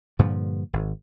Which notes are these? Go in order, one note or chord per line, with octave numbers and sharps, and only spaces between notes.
G2 A#2 D3 F3
G#1